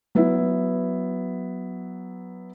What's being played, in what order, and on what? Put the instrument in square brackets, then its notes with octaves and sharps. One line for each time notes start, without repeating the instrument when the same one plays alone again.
[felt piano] F#3 B3 E4